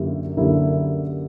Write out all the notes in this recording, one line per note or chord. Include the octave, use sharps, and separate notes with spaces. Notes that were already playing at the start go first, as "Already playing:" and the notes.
Already playing: F#2 D3 A#3 E4 G4
F#2 D3 A#3 E4 G4